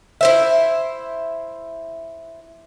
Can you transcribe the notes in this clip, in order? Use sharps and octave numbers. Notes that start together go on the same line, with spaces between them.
E4 C5 E5